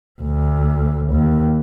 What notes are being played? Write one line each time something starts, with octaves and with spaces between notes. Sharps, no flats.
D2
D#2